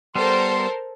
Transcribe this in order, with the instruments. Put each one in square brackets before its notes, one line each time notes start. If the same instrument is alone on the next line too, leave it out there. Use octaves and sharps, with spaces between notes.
[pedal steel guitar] G3 B3 [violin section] A4 A#4 C5 [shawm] C6